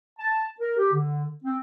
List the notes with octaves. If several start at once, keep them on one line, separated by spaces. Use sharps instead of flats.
A5
A#4
G4
D3
C4